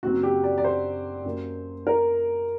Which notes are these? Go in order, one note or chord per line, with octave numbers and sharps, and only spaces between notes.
F#1 F#2 F#3 C4 F#4
G4
D5
D5
C5
F#2 F#3 A#3
A#4